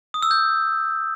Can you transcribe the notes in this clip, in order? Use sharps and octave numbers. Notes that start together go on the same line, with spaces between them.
D#6
E6
G6